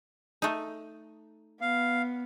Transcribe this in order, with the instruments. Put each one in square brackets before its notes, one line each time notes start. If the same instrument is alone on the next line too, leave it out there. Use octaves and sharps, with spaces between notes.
[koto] A3 D#4
[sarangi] B3 [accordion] F5